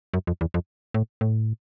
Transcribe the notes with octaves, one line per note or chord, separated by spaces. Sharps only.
F#2
F2
E2
F2
A2
A2